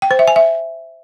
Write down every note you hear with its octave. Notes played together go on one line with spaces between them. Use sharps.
G5
C5
E5
G#5
E5